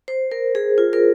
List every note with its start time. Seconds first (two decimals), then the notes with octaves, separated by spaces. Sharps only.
0.08 C5
0.32 A#4
0.55 G#4
0.78 F4
0.93 A#4